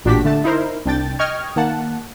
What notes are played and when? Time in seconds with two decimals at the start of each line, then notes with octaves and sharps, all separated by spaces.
0.05 A1 A#2 D4 F#4 G4 B6
0.24 D3 A3 A5
0.44 D#4 E4 A#4 C5
0.86 C2 D4 G5 A6
1.19 D#5 G5 C#6 F6 G#6
1.56 D#3 A#3 F#5 A5